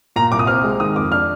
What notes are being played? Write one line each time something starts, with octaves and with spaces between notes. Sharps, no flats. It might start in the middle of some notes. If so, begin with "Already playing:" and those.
A#2 A#5
C2 D6
D#6
C4 F6
G#3
D#3 D#6
F2 D6
D4 F6